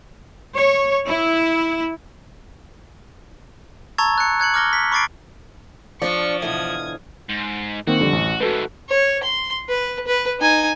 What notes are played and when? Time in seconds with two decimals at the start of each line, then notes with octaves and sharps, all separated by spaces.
0.54 C#5
1.07 E4
3.98 A5 A#5 C#6 E6 G#6 A6
4.18 F#6 C#7
4.40 F#6 G#6 C#7 F#7
4.54 D6 F6 A#6 G7
4.73 B6
4.92 B5 C#6 D6 A6 C7 D7
6.02 F3 D4 D5 C#6
6.42 B2 D3 E3 D#6 G#6
7.29 G#2
7.87 D#3 A#3 C4 F#4
7.99 F2 D3 G3
8.13 A1
8.41 G#2 E3 F#4 A4 B4
8.89 C#5
9.23 C6
9.69 B4
10.07 B4
10.40 D#4 G#5